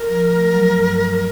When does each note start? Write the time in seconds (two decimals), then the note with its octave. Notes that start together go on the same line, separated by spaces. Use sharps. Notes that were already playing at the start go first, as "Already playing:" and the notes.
Already playing: A#4
0.09 F3
0.32 A3
0.53 F#3
0.75 G2
0.97 G2